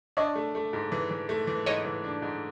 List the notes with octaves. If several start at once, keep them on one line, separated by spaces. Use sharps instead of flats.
D4 C#5 D#5
A3
A3
G#2
E3
E3
A3
E3
G#2 C#5 D#5
E3
D4
G#2